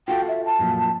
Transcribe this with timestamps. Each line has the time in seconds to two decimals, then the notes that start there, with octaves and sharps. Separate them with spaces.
0.08 F4 F#4 A4 G5
0.28 E5
0.45 A5
0.59 F#2 A#2 F3